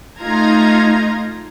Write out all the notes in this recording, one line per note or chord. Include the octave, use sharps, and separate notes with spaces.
A3 D#4 F4 A#5 G#6